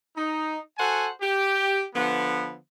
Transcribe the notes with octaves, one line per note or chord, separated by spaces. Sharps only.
D#4
F#4 A4 C5 F#5 G#5
G4
D3 F3 B3